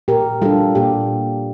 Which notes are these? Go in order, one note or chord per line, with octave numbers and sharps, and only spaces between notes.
A#2 G4 A#4
G3 D4 F4 A4
A#2 G4